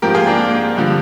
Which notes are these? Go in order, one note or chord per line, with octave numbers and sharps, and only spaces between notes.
G#2 F3 G4 A#4
F4 G#4
A#3 D4
G2 D3 F3